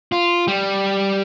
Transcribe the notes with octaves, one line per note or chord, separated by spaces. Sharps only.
F4
G3